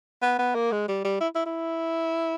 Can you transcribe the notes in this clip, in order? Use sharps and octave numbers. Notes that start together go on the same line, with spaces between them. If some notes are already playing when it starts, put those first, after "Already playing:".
B3
B3
A#3
G#3
G3
G3
E4
E4
E4